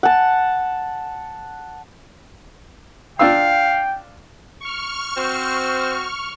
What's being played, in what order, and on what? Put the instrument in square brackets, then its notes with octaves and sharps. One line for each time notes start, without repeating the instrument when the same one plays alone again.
[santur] F#5 A5
[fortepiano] D4 F4 E6 [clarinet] F5 [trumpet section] G5
[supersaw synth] C#6 F6
[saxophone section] C4 F#4 C5